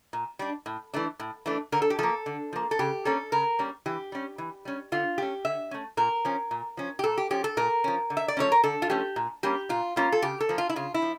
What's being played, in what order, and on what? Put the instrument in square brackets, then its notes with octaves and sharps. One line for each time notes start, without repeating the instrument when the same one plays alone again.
[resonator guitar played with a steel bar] A#2
G3 D4
A2
E3 A3 D4
A2
E3 A3 D4
D3 A#4
A4
G4
F3 A#3 A4
D3
F3 A#3
A4
C#3 G4
G3 A#3 C#4 A4
C#3 A#4
G3 A#3 C#4
E3 G4
G3 C#4
E3
G3 C#4
D3 F4
A3 C#4 G4
D3 E5
A3 C#4
A#2 A#4
F3 C#4
A#2
F3 C#4
G4
A#2 A4
G4
F3 C#4 G4
A4
A#2 A#4
F3 C#4
D3
E5
D5
F3 A3 C#4 C#5
A#4
D3 A4
F4
F3 A3 C#4 G4
A#2
G3 A#3 C#4 G4
A#2 F4
G3 A#3 C#4 F4
A4
C#3 G4
A4
F3 A#3
F4
E4
C#3 F4
E4
F3